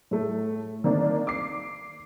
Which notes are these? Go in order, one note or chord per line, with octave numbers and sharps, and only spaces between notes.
A2 A3
D#3 A#3 C4 D4 D#4
D6 C7